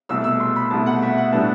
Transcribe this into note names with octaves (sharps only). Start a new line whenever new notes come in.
C2 B2 A3 E6
E6
C6
B5
C2 B2 A3 A5
F#5
E5
F#5
A2 G3 B3 D4 A5